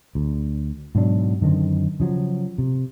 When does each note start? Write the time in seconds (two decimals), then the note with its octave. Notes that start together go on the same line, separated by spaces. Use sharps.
0.15 D2
0.95 G#2 B2 F#3 D4
1.41 F#2 D3 D#3 C4
2.00 C#3 F3 F#3
2.58 C3